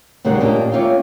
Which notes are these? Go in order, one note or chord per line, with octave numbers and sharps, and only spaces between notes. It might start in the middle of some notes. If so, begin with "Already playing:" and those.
D#2 C#3 G3 A#3 B3 F#5
A#2 A#3 C#4 D4 G4 D#5
A#3 C#4 F4 E5 F5 G5